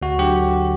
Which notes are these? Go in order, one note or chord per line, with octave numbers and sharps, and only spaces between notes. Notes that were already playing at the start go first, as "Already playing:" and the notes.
D2 F#4
D3 F#3 G4